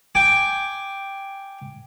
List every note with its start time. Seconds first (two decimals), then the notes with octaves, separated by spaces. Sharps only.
0.15 G5 G#5 D6